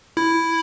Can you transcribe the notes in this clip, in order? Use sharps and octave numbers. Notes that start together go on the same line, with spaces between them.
E4